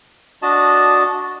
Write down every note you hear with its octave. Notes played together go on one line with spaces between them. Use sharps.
D4 F#4 D#5 A5